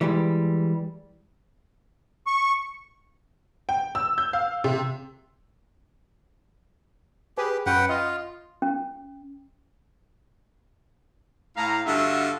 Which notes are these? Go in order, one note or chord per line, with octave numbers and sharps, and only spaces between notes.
E3 G3 G#3 G4
C#6
G5
E6
G6
F5
C3
G4 G#4 B4
F#2 C#4 B4 F#5 G5
F4 D#5
C#4
A2 F5 A#5
G2 D3 F4 F#4 E5